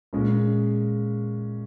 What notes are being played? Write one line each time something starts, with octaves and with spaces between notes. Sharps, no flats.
A#2 G#3 C#4